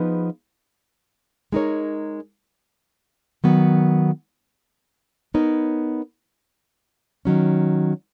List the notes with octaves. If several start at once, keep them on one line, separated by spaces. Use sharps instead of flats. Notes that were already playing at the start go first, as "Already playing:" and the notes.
Already playing: F3 B3 D#4 G#4 B4
G#3 D#4 A#4 C#5
D#3 F#3 B3
B3 D#4 A#4 C#5
D#3 F#3 C#4